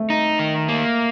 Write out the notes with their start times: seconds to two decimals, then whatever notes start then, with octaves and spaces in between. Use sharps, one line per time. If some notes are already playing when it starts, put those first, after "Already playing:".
Already playing: A3
0.10 D#4
0.39 D#3
0.68 A#3